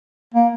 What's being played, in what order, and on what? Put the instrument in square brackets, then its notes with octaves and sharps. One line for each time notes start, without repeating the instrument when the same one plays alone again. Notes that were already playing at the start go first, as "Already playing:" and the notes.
[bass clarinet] A#3